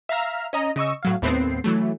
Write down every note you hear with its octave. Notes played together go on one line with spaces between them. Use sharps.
E5 F5 A#5 F6
C#4 D#5 A#5
C#3 D#5 C#6 E6
A2 F#3 F5
D#2 A2 B3 C4 C7
E3 F#3 A3